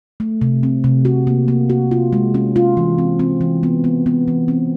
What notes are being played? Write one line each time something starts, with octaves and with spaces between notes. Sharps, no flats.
A3
C3
C4
C3
F#4
A#3
A#3
F#4
F4
G#3
C#4
F4
E3
C4
C4
E3
B3
B3
B3
E3
C4